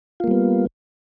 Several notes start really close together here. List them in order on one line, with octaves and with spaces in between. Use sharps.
F4 A#3 G3 B3